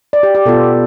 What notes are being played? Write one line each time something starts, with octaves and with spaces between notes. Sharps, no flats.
D5
G4
G4
B2 B3 F4 A4